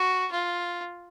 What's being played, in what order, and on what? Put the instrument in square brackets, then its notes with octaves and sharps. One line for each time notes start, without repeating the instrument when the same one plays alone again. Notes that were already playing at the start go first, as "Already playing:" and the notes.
Already playing: [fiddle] F#4
F4